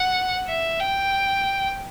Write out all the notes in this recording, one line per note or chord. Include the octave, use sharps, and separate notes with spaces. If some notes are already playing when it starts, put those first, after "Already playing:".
Already playing: F#5
E5
G5